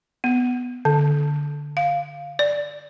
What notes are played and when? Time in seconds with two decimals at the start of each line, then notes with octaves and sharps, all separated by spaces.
0.24 B3
0.85 D3
1.77 F5
2.39 D5